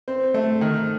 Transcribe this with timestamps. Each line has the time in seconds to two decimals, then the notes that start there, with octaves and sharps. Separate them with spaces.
0.08 C4
0.34 A3
0.61 D#3